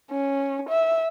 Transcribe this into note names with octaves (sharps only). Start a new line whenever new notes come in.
C#4
E5